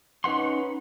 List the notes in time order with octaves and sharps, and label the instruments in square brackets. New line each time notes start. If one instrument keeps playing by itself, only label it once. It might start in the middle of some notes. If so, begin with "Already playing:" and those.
[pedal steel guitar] C#4 D#4 B4 F#5 C6